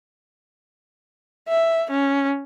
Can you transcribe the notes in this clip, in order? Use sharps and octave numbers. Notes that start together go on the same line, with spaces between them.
E5
C#4